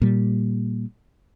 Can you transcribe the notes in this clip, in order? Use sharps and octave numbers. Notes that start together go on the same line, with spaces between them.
A#2 G3